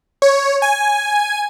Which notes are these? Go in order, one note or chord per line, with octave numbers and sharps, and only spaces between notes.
C#5
G#5